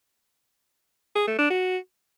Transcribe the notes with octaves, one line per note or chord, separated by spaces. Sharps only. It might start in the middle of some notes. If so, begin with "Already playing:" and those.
G#4
A3
D4
F#4